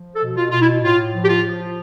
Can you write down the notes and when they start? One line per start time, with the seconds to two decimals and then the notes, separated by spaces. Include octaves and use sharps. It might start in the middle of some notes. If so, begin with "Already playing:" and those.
Already playing: F3
0.15 A4
0.22 B2
0.37 F4
0.50 B2 F4
0.60 E4
0.83 A2 F4
1.13 F3
1.22 G4
1.29 F4
1.44 F3